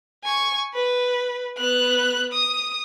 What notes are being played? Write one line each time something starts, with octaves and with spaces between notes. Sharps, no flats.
G#5 C#6
B4
B3 F#6
D#6